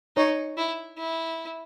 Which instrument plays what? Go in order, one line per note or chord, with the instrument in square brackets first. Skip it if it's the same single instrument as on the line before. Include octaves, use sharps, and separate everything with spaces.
[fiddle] D#4 [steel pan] C#5
[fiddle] E4
E4